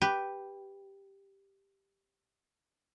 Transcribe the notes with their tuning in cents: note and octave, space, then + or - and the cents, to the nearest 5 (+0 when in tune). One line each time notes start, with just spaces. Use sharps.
G4 +0 B4 +0